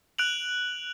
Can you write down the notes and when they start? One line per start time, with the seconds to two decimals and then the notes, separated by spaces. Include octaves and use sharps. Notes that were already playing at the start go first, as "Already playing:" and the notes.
0.19 F#6 D7 F7 F#7